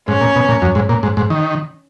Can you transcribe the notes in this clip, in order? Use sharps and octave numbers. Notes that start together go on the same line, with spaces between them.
G#2 C#4
A#2
B2
A#2
F#2
G#2
A#2
G#2
G#2
D#3